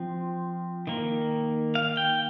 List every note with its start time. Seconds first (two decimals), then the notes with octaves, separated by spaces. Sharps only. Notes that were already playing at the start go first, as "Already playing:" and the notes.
Already playing: F3 C4
0.87 D#3 A#3
1.75 F5
1.97 G5